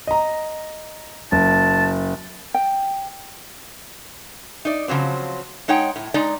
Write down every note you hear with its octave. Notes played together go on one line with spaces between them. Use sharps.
D#5 A#5
F#1 A5
G5
D#4 D5
C#3 F3 F#3 C4
G#3 D#4 C#5 F#5 G5
A2
G#3 D#4 D5 A#5